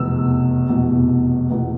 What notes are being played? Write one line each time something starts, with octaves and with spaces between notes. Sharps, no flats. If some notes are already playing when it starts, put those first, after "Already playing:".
Already playing: F1 E2 B2 B3 E6
F1 E2 B2 B3
E2 B2 B3